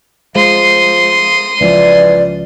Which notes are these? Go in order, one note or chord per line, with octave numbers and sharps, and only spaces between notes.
F3 G#3 C6 D#6
C#2 E3 F3 D5